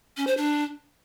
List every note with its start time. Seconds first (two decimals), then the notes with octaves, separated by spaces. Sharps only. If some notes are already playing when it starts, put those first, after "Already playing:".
0.17 C#4
0.27 C5
0.37 D4